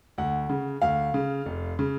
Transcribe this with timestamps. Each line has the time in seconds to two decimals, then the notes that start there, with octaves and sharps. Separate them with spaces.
0.18 D2 F#5
0.49 C#3
0.82 D2 F5
1.14 C#3
1.46 F1
1.79 C#3